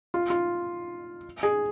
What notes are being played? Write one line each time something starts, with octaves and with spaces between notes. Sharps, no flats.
F4
F4
G#4